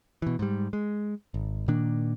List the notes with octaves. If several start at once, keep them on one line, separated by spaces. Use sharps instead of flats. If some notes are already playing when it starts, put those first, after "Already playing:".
B2 E3
G#2 G3
G#3
G#1
A#2 D#3 A#3 D4